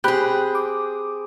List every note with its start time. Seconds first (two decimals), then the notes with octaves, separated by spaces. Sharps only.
0.04 C4 G4 G#4 B5 F#6 G6
0.55 D6